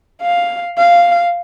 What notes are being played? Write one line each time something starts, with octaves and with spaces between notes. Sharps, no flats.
F5
F5